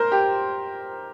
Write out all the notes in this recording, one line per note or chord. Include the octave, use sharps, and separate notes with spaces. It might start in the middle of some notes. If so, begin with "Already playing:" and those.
Already playing: A#4 C5
G4